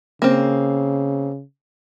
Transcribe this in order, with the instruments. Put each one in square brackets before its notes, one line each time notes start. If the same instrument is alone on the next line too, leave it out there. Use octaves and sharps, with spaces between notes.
[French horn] C#3 [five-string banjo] A#3 C4